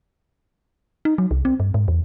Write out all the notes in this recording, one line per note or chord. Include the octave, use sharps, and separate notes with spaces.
D#4
F#3
C2
C4
G2
G#2
E2